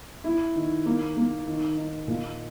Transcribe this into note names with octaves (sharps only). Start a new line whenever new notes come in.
E4
D#3
A#3
A#3
D#3
D#4
A#2